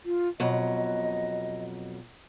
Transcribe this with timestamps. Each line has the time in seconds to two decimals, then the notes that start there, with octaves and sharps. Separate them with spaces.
0.05 F4
0.40 F2 B2 F#3 D#5